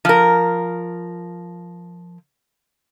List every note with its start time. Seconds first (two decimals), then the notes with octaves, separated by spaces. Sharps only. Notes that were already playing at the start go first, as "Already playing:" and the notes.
0.05 F3 A#4